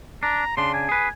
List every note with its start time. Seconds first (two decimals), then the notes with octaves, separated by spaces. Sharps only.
0.23 D4 A#5
0.57 C#3 D4 C6
0.74 G#5
0.89 G#4 B4